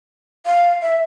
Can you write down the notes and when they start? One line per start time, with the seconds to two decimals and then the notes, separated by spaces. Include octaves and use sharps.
0.46 F5
0.82 E5